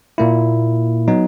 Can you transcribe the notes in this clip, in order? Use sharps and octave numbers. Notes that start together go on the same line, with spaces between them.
A#2 A#3 E4
F#3 B3 D#4